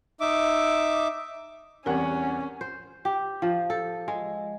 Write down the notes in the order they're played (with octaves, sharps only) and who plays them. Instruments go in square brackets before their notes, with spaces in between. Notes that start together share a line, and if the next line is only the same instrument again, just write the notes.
[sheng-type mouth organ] D#4 E5 D6
[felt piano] E2 G3 F#5 [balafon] C4 A#4 [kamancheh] C#4
[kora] C5
G4
F3
A4
G#3